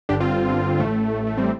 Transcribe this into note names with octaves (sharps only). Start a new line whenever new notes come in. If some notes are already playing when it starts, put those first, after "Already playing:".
G1 G2 D3 D4 G4
C4 F4
G1 G2 D3
A1 A2 A3
A1 A2 A3
A3
G3 C4